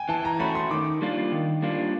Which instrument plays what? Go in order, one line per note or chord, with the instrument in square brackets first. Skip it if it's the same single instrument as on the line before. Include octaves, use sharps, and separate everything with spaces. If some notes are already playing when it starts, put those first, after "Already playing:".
Already playing: [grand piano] G5 G#5
[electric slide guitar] E3 [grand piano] A5
[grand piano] A#5
[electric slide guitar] A3 C#4 F#4 [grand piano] B5
[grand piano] C6
[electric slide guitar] D#3 [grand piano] D6
[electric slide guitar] G3 A#3 D4 F4
D#3
G3 A#3 D4 F4